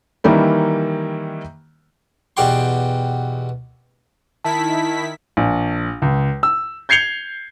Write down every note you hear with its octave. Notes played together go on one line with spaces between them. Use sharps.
D#3 E3 G3 A#3 E4
E2 B2 G4 D5 G5 C6
D#3 E4 A5 B6
A#1
C#2
E6
G6 G#6 C7 C#7 F7 G7